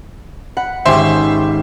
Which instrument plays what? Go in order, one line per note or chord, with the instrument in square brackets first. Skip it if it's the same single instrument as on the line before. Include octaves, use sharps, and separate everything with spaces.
[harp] F#5 [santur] B5
[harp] G#1 [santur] C#4 G4 [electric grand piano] C5 E5 C6